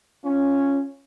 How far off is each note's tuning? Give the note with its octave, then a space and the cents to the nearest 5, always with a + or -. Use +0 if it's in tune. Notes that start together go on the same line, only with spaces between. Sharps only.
C#4 +0 F4 +0